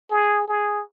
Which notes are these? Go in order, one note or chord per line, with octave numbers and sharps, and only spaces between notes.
G#4
G#4